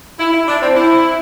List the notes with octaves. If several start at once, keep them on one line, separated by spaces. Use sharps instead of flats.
E4
E4
D4
C4
E4